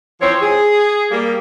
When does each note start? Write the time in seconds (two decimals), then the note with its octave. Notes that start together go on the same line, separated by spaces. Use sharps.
0.21 E3 F3 C4 C#5
0.41 G#4
1.11 G3 A#3